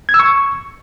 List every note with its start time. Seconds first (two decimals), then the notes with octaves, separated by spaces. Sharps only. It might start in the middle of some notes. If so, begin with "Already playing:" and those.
0.09 G#6
0.14 E6
0.19 C#6